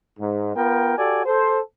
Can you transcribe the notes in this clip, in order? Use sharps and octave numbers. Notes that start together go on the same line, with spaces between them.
G#2
B3 F4 A#4 G5
F#4 G4 A4 D5 G#5
A4 C5